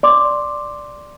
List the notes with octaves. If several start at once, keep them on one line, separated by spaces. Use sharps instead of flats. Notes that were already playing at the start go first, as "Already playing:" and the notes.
D5 C6 D6